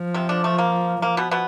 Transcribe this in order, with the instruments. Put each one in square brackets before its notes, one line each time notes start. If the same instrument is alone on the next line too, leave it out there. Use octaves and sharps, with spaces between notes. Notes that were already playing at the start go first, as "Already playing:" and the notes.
Already playing: [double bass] F3
[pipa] C3 C4
D3 D4
A3
A#3
[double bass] F3 [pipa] A#3
[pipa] B2 B3
B2 B3